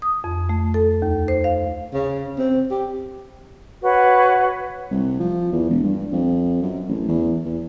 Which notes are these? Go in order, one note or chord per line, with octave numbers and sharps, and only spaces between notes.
D#6
F2
A3
A4
D#2
C5
F5
C#3
C4
G4
F#4 B4 C#5 F#5
C2
F3
E2
E1
G2
F2
F#2
A1
E2
E2